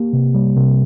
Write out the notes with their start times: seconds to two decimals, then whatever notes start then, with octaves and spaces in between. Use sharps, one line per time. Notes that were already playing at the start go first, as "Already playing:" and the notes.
Already playing: A#3 G4
0.13 C3
0.34 G3
0.57 C3